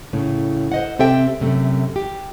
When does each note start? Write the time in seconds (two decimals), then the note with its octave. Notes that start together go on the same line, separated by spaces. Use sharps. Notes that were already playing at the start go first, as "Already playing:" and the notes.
0.13 A2 C#3
0.72 C5 D#5 F#5
0.99 C3 C4 G4 A4 E5 G5
1.40 F#2 C3 A3
1.96 G4